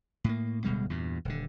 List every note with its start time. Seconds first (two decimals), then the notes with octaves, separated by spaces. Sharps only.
0.24 A2 A#3
0.64 D1 B2 G3 G#3
0.90 E2 G2 A#2
1.25 D#1 D3